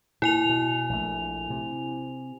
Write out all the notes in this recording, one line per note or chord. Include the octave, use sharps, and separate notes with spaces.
A#2 E4 G#5 F7
B2
A#1 A3
C3